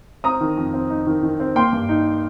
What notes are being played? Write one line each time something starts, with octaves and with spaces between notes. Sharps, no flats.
C4 A#5 D#6
D#3
F2
C4
D#4
D#3
D#3
C4
A#3 G5 C6
G2
D#4